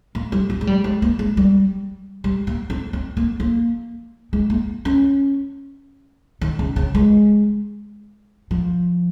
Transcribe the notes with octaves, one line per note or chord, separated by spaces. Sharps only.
A#3
G3
F3
G#3
G3
G#3
A#3
G#3
G3
G3
A#3
C4
C4
A#3
A#3
G#3
A#3
C#4
D#3
C#3
C#3
G#3
F3